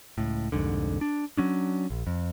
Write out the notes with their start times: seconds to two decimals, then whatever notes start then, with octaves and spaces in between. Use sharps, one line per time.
0.18 C#2 A2
0.52 C2 F2 G#2 D3
1.01 D4
1.37 F#3 C#4 D4
1.90 A#1
2.07 F2